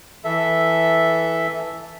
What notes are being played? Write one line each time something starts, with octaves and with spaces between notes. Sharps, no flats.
E3 A4 E5